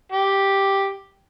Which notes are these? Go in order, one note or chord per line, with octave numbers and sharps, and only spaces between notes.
G4